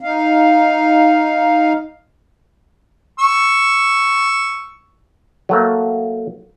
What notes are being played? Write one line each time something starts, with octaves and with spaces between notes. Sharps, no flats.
D#4 F5
C#6 E6
F#3 A3 A#3